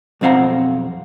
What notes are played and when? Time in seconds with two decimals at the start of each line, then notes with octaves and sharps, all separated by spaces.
0.21 B1 F2 C4 F5 F#5 A#5